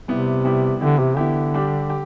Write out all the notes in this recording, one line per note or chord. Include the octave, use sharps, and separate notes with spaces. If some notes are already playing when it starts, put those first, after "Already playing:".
C3 G3 B3 E4
G3 B3 E4
D3 E3 B3 E4 G4
C3
D3 E3 B3 E4 G4
G3 D4 G4
G4